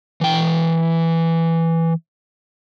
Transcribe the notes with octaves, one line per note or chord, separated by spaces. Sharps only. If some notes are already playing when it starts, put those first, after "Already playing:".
E3 G5